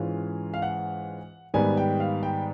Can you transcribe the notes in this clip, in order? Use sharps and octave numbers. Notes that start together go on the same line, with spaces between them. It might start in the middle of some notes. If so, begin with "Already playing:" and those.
Already playing: G#2 E3 G#3 C#4 F4
F5
F#5
G#2 D#3 G3 B3 G#5
G5
F5
G5